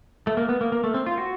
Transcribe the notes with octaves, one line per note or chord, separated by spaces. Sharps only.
A3
A#3
B3
A#3
A#3
A3
C4
F4
F#4